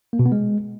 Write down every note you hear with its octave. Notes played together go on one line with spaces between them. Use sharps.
A#3
B2
B3
G#3